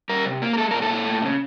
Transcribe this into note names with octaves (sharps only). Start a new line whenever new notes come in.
G3 A#4
C3
A#3
A#4
G#3 A4
A#2 A#4
A4
A#2
A3
C#3